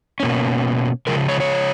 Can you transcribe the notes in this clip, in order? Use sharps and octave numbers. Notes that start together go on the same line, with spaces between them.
B2 A#3 C#4
C#3 F3 G#3 A#4
C#5
C#5